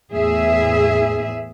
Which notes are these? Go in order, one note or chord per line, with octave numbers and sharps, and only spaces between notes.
E2 A2 G#4 E5